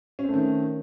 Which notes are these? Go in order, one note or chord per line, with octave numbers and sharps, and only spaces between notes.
D#3 A3 C4 C#4